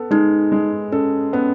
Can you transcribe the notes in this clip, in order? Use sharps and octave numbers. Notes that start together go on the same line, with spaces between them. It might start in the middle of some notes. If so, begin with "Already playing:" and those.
Already playing: B3 A4
G#3 D#4
G#3
C#4 A4
B3 C#4